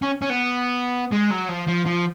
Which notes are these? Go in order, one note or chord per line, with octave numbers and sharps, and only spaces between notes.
C#4
C#4
B3
G#3
F#3
F3
F3
F3